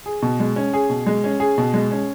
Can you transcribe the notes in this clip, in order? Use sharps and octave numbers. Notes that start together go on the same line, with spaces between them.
G#4
B2
G#3
C#4
G#4
B2
G#3
C#4
G#4
B2
G#3
C#4